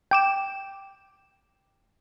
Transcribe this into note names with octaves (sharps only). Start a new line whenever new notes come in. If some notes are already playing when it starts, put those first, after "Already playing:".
G5 D6 E7